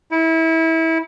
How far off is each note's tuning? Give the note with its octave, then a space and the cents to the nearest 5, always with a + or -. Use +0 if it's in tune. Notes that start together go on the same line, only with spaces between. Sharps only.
E4 -25